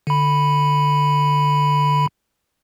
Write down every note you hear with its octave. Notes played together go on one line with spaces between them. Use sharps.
D3 B5